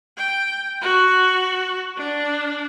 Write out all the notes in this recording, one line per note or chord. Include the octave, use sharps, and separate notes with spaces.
G5
F#4
D4